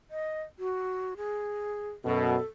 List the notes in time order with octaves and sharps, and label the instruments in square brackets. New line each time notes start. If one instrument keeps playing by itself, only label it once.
[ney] D#5
F#4
G#4
[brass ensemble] F#2 B2 [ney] A4